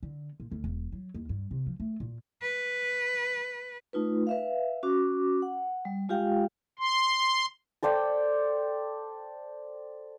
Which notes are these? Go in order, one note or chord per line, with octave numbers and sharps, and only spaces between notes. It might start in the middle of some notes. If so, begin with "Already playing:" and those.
D3
A#2
D2
E1
F#3
D#2
G2
C3
F3
A3
A#2
B4
A3 D#4 F4 B4
B4 E5 F5
C#4 F#4 D6
F#5
G3
G#3 F4 G4 F5 G5
C6
A4 C5 D5 G5